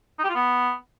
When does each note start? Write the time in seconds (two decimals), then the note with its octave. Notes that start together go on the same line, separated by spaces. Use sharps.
0.19 D#4
0.24 G4
0.29 F4
0.35 B3